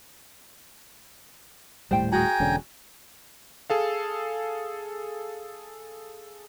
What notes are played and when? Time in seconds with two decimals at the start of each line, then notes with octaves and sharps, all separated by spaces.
1.91 D#1 A2 G3 C5 G5
2.12 F#4 G#4 G5 G#5 A#5
2.40 E1 D3 C#4
3.70 G#4 A4 F5